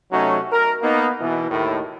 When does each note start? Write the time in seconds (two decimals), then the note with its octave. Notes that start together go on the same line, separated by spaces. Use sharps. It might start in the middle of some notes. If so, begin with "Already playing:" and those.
0.11 C3 F#3 A3 C#4 D#4 F#4
0.51 A#4
0.82 A#3 B3 D#4
1.20 B2 E3
1.50 D#2 A2 D#3